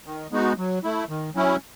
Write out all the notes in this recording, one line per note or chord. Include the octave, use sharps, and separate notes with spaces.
D#3
G#3 B3 D#4 F#4
F#3
A3 E4
D#3
F#3 C#4 E4